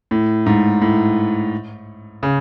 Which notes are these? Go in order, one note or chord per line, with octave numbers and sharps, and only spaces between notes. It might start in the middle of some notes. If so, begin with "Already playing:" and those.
A2
G#2
A2
C#3